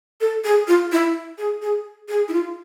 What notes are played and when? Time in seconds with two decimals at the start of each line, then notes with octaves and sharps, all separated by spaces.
0.21 A4
0.44 G#4
0.68 F4
0.92 E4
1.38 G#4
1.62 G#4
2.09 G#4
2.28 E4
2.33 F4